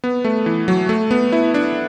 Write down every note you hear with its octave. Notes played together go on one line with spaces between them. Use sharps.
B3
A3
E3
F#3
A3
B3
E4
D4